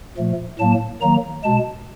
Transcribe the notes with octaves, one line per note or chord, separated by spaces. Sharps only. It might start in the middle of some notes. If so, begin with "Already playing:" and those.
A#2 F3 A3
A2 F#3 A#3 A5
D#3 F#3 A#3 A#5
B2 G#3 A5